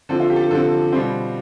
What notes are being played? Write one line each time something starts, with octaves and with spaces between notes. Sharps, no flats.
D3 F3 C4 A4
F4
G4
A4
G4
D3 F3 C4 A4
B2 G3 C4 F4